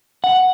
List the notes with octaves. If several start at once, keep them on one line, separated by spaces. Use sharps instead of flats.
F#5